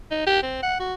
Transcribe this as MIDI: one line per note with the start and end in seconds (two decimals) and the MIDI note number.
0.11 0.24 63
0.26 0.41 67
0.42 0.61 60
0.62 0.78 78
0.79 0.94 66